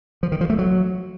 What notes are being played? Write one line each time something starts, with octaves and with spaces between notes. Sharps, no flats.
F3
D#3
F3
A3
F#3